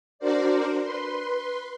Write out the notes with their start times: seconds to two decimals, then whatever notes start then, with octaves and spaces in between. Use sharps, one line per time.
0.19 D4 F#4 A#4 C5 D5
0.81 B4 C6